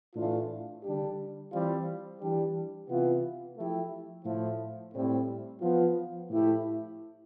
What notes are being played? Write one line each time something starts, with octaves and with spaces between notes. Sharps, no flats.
A2 E3 A3 D4 F4
D3 G3 D4 G4
E3 G3 C4 F4
E3 G3 D4 G4
C3 E3 B3 F4
F3 A3 E4 G4
A2 F3 A3 E4
A2 G3 C4
F3 B3 F4
A2 F3 A3 E4 G4